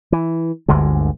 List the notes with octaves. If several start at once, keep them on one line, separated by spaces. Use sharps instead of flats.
E3
G1 D2 D3 G#3